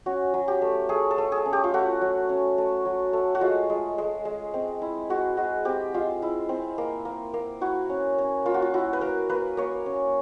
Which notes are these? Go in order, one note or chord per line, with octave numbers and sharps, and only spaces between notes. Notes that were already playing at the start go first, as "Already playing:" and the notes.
C#4 F#4
F#3
G4
A3
A3 G#4
A4
A3
G#4
C#4
G4
F4
A3 F#4
F#3
C#4
A3
F#3
A3
F#4
G#3 F4
G#3
G#3
G#3
C4
E4
G#3 F#4
G#3 F#4
C4 G4
G#3 F4
E4
C4
A#3
A#3
A#3
E4 F#4
C#4
C#4
A#3 F4
F#4
F4
E4 F#4
B4
A#3 A#4
A#3 B4
A#3 C#5
C#4